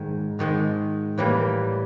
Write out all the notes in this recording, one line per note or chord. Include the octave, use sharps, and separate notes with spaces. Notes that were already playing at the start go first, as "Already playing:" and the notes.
Already playing: G#2 D#3 G#3
G#2 D#3 G#3
A2 E3 G3 A#3